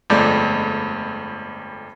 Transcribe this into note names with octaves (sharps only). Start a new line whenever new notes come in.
G1 F2 G#3 A3 D5 G6